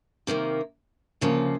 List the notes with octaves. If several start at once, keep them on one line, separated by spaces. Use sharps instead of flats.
C3 D#3 G3 A#3
D2 C#3 F3 A#3